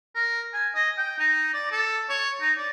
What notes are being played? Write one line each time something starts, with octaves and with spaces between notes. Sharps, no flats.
A#4
G#5
D#5
G5
D#4
D5
A4
C#5
D#4
D5